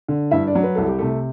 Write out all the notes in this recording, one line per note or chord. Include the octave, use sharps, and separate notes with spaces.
D3
G2 E4 E5
D4 D5
F#3
B4
C2 A4
G4
C3 A3 A4